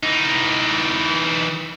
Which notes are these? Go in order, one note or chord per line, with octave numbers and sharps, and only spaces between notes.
E3 D#4